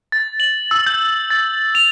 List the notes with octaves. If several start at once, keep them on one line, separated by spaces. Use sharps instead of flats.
A6
F#7
E6
G6
A6
F7